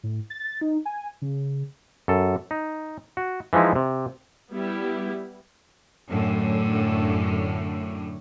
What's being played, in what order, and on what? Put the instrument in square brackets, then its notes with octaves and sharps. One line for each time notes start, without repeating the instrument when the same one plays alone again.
[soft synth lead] A2
A6
D#4
G#5
C#3
[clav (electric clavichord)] F#2 A4
D#4
F#4
E3 F3 G#3 D#4 E4
C3
[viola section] G3 B3 E4 G4
[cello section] F#2 A2 D3